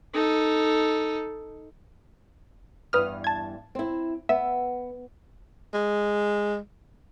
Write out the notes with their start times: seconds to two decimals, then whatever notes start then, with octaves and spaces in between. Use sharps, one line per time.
0.14 D#4 A4
2.93 E2 G2 B4 D#6 F6
3.24 A5 G#6
3.75 C4 E4
4.29 B3 E5
5.73 G#3